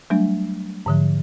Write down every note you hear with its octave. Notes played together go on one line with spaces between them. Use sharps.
F#3 G3 A3 D4
G#2 D3 F3